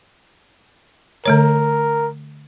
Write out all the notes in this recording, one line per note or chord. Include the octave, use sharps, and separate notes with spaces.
D3 A3 A#4 C#5